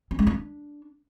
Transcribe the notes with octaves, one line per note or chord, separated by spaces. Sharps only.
C#4
G#3
D4